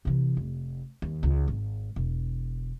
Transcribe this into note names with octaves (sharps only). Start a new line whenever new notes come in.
C3 E3
F1
D#2
C#2
G#1
E1